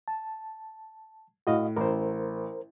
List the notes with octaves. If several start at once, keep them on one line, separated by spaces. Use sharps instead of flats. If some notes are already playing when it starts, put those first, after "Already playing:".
A5
A2 F#4 D#5 F5
A1 A#4 C5